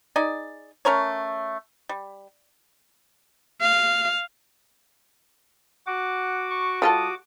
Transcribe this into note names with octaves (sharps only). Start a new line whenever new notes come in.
D#4 G#4 D5
A3 C#4 A#4 C#5
G3
F5
F#4 F#5 D6
C#6
G3 F4 A4 D#6